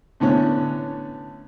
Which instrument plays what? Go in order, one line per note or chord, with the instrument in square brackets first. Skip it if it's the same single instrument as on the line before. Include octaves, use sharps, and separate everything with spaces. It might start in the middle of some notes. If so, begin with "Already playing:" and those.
[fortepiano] A2 D3 B3 C#4